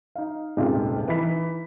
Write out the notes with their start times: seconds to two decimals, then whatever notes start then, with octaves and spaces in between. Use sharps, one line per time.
0.15 D#4 F5
0.57 D#1 C#2 G#2 C3 G#3 F4
1.08 E3 D#4 B5 B6